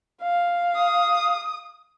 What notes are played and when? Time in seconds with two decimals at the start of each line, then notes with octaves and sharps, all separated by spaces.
0.22 F5
0.76 D#6